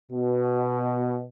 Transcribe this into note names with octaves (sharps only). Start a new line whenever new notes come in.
B2